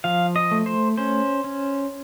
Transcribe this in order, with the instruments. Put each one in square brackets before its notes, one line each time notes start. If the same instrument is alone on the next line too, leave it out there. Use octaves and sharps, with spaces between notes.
[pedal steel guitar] F3 F5
D#5
A3
C5
C#4 C5
C#4